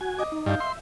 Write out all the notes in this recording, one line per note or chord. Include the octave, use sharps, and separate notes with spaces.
F#4 G#5
D#5 D6
D#4
G2 D#5 F5 G6
E5 C6